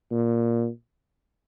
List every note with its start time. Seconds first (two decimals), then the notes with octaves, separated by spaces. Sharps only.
0.11 A#2